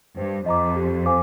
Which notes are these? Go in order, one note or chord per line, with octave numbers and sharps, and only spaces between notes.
G2 C5
F2 D#5 A#5 D6
G4
C5 F5 G#5 D6